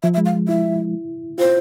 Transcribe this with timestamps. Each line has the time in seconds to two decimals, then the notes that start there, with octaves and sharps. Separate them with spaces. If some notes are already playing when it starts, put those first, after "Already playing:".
0.03 F3 E5
0.14 E5
0.18 G#3
0.26 F5
0.48 E4 E5
1.38 F4 C5